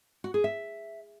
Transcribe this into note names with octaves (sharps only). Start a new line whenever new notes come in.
F#4
G#4
E5